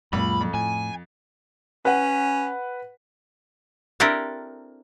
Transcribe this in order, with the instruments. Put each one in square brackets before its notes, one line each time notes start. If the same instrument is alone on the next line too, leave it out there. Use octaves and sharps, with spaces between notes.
[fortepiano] C#2 [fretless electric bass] F#2 A#2 [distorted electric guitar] B5
[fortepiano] F2
[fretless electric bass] A2 [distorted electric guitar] G#5
[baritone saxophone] C#4 [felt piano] B4 F#5
[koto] C4 D4 E4 G4 A4 A#4